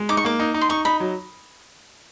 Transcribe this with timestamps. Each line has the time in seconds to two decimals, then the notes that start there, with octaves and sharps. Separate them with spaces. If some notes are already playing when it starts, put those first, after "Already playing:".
Already playing: G#3
0.09 D#4 D6
0.17 C#6
0.25 A#3 D6
0.40 D#4
0.54 D#4
0.61 C6
0.69 D#4 C#6
0.85 D#4 B5
1.00 F#3